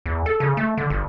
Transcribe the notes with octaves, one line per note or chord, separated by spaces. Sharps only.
E2
A4
C#3
A3
D3
G1